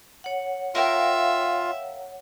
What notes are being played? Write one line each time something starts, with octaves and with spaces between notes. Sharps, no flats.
C#5 F#5
F4 A#4 E5 F5 G5